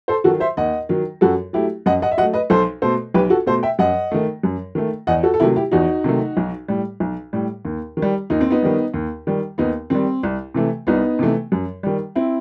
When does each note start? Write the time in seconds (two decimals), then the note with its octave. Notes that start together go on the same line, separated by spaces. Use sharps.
0.08 A4 C5
0.24 D#3 F#4 A4
0.28 F#3
0.40 C5 E5
0.57 D#2 D#5 F#5
0.89 D#3 F#3
1.21 F#2 F#4 A4
1.53 F#3 A3 E4 G4
1.86 F#2 D#5 F#5
2.02 D#5 F#5
2.11 E5
2.17 F#3 D#5 F#5
2.23 A3
2.33 B4 D#5
2.50 B1 A4 C5
2.82 B2 A3 A4 C5
3.14 B1 G4 B4
3.30 F#4 A4
3.46 B2 A3 A4 C5
3.63 E5 G5
3.79 F#2 D#5 F#5
4.12 D#3 A3
4.43 F#2
4.75 D#3 A3
5.07 E2 D#5 F#5
5.23 F#4 A4
5.34 A4
5.40 C3 D#3 F#3 A3 E4 G4
5.56 E4 G4
5.72 E2 D#4 F#4
6.04 C3 D#3 F#3 A3
6.37 B1
6.68 A2 G3
7.00 B1
7.33 A2 G3
7.65 D#2
7.97 D#3
8.02 G3
8.30 D#2 D#4
8.41 C4
8.50 B3 D#4
8.62 D#3 G3
8.94 D#2
9.27 D#3 G3
9.58 D#2 B3 D#4
9.90 D#3 G3 C4
10.23 C2
10.54 C3 E3 A3
10.87 C2 B3 D#4
11.19 C3 E3 A3
11.52 F#2
11.83 D#3 G3
12.16 C4 E4